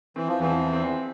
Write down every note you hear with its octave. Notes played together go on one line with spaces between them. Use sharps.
E3 C4
F3
E2 E3 C4
C4